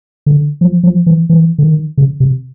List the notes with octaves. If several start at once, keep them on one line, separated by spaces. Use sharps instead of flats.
D3
F3
F3
E3
E3
D3
D#3
C#3
C3